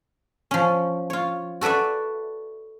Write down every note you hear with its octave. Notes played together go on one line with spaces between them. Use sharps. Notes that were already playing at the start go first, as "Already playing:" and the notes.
F3 C#4
F4 C#5
F#4 A4 B4 D5 E5